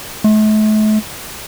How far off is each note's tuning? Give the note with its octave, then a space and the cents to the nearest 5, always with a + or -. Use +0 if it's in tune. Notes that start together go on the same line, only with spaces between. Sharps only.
A3 -40